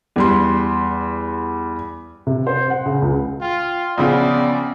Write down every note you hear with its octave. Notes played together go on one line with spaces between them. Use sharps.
E2 G3 C6
C3
C5
F#5
C#3
C#2
F4 G5
A#1 C#3 B3 F4 D5 F#5